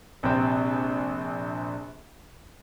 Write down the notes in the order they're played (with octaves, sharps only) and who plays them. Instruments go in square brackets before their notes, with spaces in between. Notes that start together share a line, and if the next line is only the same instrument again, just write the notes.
[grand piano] A#1 C3 C4